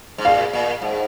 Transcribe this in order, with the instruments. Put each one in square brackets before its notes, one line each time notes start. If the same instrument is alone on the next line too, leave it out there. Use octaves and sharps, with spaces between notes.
[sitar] G#2
[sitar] A#2 [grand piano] F5
[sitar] A#2
G#2